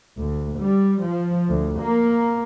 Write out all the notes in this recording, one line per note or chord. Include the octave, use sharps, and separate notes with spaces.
D2
G3
F3
D2
A#3